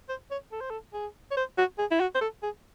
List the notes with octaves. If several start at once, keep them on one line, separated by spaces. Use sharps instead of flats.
C5
C#5
A4
C5
A4
G#4
C#5
C5
F#4
G#4
E4
F#4
C5
A4
G#4